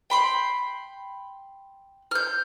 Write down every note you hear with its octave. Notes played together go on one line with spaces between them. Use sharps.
G5 B5 C6
F6 G6